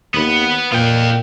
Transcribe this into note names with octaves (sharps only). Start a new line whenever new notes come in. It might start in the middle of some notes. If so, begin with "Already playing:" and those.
D#2 B3 B4
A#2 F4 G5